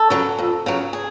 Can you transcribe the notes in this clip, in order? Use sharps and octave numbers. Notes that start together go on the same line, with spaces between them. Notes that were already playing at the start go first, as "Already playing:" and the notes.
Already playing: A4
C#3 F#3
F2
C#3 F#3
G#4